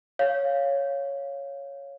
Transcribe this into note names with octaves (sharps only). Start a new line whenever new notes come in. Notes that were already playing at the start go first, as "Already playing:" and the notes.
C#5 F5